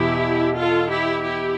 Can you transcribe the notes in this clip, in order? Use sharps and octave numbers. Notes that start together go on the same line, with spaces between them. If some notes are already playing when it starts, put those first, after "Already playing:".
Already playing: E2 B2 E4 G4
F4 A4
E4 G4
E4 G4